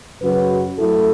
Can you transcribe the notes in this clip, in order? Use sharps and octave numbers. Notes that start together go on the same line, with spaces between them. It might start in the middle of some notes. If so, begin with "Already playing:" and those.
F#2 C#3 F#3 F#4 B4
F#2 F#3 A3 E4 A4